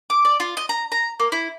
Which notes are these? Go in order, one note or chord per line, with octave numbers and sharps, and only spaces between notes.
D6
D5
F4
D#5
A#5
A#5
A#3
E4